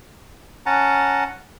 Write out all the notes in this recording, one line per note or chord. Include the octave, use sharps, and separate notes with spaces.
C#4 F#5 A5 A#5